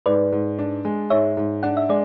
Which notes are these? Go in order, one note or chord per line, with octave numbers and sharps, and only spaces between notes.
G#2 B4 D5
G#2
D4
G#3
G#2 C#5 E5
G#2
D4 F#5
E5
G#3 D5